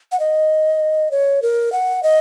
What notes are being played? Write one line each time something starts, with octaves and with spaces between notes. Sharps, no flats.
F#5
D#5
C#5
A#4
F#5
D#5